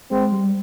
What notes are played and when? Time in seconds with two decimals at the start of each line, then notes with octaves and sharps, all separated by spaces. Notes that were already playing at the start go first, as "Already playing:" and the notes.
0.11 G#3 C4
0.32 G3